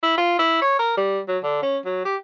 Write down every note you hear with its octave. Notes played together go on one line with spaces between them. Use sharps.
E4
F4
E4
C#5
A#4
G3
F#3
D3
C#4
F#3
G4